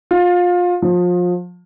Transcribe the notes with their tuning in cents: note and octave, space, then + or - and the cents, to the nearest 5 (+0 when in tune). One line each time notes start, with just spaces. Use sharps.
F4 +25
F3 +30